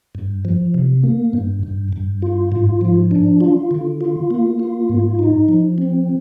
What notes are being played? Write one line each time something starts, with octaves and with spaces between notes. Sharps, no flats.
G2
F3
C3
A#3
G2
G2
G2
F4
G#2
F3
D4
F4
D3
F4
A#3
F4
G#2
D#4
F3
C4